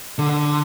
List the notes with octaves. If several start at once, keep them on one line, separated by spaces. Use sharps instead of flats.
D3